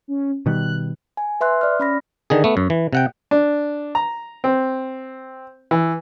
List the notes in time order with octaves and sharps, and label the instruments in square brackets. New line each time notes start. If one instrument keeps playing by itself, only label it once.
[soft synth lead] C#4
[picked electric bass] B2 D#3 G3 [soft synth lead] F#6
[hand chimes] G#5
B4 E5 C6 F#6
D5 F6
C#4 B5 A#6
[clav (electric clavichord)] D3 D#3 G#4
A3 B3
F#2
E3
C3 F#5 G5
[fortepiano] D4
A#5
C4
E3